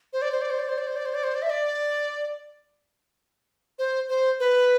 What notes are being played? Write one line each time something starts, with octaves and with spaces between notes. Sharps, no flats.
C5
D5
C5
D5
C5
D5
C5
D5
C5
D5
C5
D5
C5
D5
E5
D5
C5
C5
B4